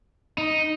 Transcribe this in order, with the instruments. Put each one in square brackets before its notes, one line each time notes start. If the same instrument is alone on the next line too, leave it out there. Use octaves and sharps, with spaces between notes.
[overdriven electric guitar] D#4